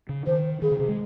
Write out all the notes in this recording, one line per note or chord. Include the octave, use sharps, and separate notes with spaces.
C#3
D#3 C5
D#3 G#4
C#3
C3
G#3